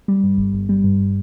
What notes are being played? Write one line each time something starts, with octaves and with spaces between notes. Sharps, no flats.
G3
G2
G1
G1
G3
G2